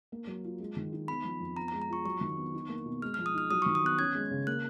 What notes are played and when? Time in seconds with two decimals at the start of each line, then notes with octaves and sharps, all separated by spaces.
0.12 A#3
0.27 F#3
0.44 F4
0.60 G#3
0.76 D#3
0.92 D#4
1.08 B3 B5
1.24 F3
1.40 F2
1.56 B3 A#5
1.68 A#5
1.73 G#3
1.82 A#5
1.90 F4 C#6
2.05 F#3 C#6
2.21 D#3
2.37 B3
2.54 D#4
2.69 A#3
2.86 B2
3.02 G#3 F6
3.14 F3 F6
3.26 D#6
3.34 D#4 F6
3.51 F#3 D#6
3.62 D#3 C#6
3.75 D#6
3.83 B3 F#6
3.98 C#4 G#6
4.15 G#3
4.31 C#3
4.47 A#3 F#6